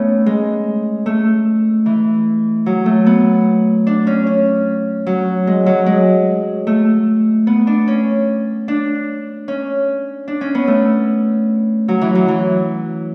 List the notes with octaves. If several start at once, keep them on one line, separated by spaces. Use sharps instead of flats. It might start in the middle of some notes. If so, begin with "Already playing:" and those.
Already playing: A3 B3 C#4
G#3
A3
E3
F#3
A3
B3
D4
C#4
C#4
F#3
G#3
F#3
G#3
A3
B3
D4
C#4
D4
C#4
D4
C#4
B3
A3
F#3
E3
F#3
E3